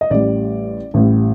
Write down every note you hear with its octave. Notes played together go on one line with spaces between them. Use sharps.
D#5
A1 A2 G3 D5
A1 A2 G3